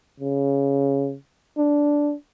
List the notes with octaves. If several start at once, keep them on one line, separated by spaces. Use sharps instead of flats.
C#3
D4